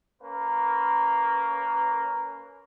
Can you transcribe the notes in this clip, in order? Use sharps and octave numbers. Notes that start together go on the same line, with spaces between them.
A#3 C#4 B4